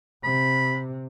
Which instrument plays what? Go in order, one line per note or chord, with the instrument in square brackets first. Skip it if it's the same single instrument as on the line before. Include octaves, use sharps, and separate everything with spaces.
[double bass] C3 [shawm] B5